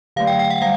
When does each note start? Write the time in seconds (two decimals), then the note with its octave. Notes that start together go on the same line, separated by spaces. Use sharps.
0.16 D3 F#3 A3 F5
0.27 G5
0.39 G5
0.50 F#5
0.62 G3 F5